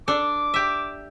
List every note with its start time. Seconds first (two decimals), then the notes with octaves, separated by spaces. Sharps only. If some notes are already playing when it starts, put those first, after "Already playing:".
0.08 D4 A4 D6
0.54 G4 E5